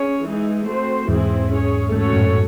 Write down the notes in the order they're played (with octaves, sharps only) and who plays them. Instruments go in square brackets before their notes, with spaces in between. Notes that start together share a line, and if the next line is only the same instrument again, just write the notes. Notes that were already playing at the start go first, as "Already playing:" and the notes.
Already playing: [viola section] C#4 G#4 C#5
E3 G#3 D#4 G#4
A3 C4 F#4 C5
[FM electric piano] E2 G#2 [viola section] E3 C4 E4 G#4
[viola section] C#4 G#4 C#5
[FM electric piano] E2 G#2 [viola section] A3 C#4 F#4 A4 C#5
[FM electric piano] F#2 A2